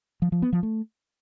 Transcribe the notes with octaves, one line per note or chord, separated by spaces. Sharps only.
F3
F3
B3
F3
A3